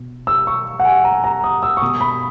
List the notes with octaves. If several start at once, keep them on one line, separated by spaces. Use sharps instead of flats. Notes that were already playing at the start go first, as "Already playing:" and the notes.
Already playing: B2
E6
C#6
F#5
G#5
A#5
A#5
D#6
E6
C#6
B2 D#6
B5